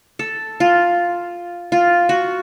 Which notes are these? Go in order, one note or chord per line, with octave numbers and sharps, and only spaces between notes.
A4
F4
F4
F#4